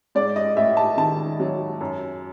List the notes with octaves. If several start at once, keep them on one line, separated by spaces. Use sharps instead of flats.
G#2 D5
D#5
A1 E5
A5
D#3 A5
F#3
F#2